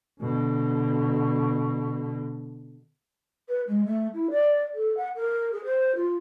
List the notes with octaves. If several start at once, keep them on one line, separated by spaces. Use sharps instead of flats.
B2 D3
B4
G#3
A3
E4
D5
A4
F#5
A#4
G#4
C5
F4